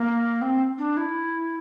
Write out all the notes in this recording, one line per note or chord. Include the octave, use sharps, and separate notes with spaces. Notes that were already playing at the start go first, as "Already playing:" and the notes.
Already playing: A#3
C4
D4
E4